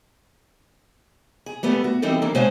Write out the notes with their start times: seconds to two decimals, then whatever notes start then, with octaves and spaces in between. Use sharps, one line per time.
1.46 G#4
1.63 G3 A3 B3
1.84 F#4
2.02 E3 G3 C4 D#4 E4 A4
2.22 D#3 E3 A#3 D4
2.35 B2 G#3 C5 C#5 F5 G#5